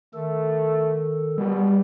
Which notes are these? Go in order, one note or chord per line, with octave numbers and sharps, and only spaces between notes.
D#3 A3 A4
B2 G3